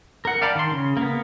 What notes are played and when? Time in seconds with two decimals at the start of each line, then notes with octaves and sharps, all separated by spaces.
0.25 A#4 F#5
0.42 D5 F5 G5 A5 B5
0.55 D#3 C6
0.71 C#3
0.97 A#3 B3